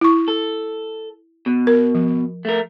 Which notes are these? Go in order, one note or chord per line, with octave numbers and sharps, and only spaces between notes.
E4 C#6
A4
B2
A#4
F3
A3 A#4